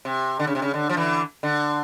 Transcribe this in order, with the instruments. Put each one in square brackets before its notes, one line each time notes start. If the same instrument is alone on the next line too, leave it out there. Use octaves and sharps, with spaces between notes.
[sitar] C3
D3
C#3
C3
C#3
D3
F3
D3 E3
D3